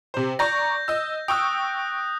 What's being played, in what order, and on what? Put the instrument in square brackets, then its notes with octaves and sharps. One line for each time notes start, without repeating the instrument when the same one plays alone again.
[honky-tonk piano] C3 C5
[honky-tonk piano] D5 A#5 C#6 [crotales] G6 A#6
[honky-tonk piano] D#5 E6
[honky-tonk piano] G5 C#6 E6 [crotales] D#6 F#6